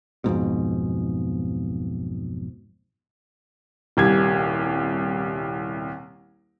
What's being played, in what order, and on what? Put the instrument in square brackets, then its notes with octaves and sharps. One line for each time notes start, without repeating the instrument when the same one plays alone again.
[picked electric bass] B1 F2 G#2 B2
[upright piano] D#1 C2 G4 G#6